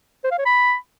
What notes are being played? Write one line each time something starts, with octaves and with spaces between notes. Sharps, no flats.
C5
F5
C#5
B5